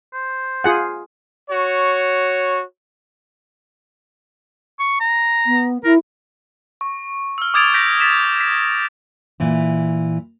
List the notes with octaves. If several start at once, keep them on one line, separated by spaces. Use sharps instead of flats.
C5
F4 G#4 F#5
F#4 C#5
C#6
A#5
B3
E4 A#4
C#6
E6 F6
D6 D#6 G#6 A6 D7 F7
G6 A#6 B6 D7
A6 B6 E7
B6
A#2 E3 E4